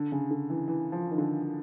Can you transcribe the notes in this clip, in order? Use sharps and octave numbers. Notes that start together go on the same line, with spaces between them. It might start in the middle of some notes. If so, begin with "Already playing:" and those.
Already playing: D3
C#3
D3
E3
E3
F3
D#3
D3